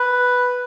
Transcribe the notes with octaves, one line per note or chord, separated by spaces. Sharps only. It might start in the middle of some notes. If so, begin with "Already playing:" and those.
Already playing: B4